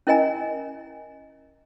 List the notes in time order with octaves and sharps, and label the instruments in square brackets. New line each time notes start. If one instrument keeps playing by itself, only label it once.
[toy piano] C#4 E4 A#4 D#5 G#5 A#5